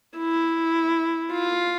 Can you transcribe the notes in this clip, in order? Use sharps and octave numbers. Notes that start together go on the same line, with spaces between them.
E4
F4